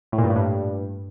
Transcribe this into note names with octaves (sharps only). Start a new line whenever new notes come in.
A2
A#2
G2
A2
G2